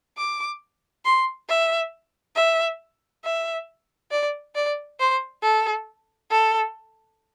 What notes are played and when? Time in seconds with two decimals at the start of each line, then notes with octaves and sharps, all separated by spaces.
0.18 D6
1.05 C6
1.49 E5
2.36 E5
3.24 E5
4.12 D5
4.55 D5
5.00 C5
5.42 A4
6.30 A4